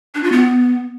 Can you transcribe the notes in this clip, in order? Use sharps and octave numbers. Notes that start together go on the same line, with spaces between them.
D4
F4
B3